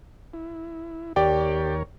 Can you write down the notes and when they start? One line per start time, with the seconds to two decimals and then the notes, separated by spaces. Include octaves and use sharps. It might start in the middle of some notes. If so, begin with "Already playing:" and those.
0.34 E4
1.16 D#2 G4 A#4 C#5 D5 G5